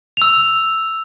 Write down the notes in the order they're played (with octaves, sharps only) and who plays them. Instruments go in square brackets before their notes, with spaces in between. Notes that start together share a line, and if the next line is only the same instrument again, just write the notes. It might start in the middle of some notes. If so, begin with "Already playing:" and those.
[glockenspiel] E6 F7